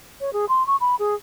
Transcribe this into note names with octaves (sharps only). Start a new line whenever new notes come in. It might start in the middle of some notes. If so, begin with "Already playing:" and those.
C#5
G#4
C6
C#6
B5
G#4